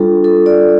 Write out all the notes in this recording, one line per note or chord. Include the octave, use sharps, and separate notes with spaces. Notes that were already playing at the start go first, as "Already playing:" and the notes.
Already playing: G3 D4 F4 A4
A4
D5